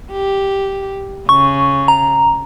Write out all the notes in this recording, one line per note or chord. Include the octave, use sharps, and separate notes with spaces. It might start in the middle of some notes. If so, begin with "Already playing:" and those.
G4
C#3 C#6
A#5